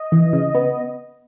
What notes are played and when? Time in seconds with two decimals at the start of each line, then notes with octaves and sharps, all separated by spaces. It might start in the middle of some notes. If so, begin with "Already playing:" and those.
Already playing: D#5
0.12 E3
0.33 C#3
0.55 B3